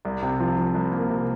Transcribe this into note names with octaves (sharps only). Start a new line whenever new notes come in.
C2
C3
F3
F3
C2
A#3
C3